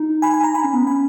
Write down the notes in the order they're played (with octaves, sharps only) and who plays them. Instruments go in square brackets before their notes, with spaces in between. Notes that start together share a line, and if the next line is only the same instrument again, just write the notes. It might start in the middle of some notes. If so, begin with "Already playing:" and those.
Already playing: [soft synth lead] D#4
[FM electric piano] G#5 B5
G#5
A#5
[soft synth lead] D#4 [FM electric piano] G#5 B5
[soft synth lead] C#4
B3
[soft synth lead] C#4 [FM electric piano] G#5 B5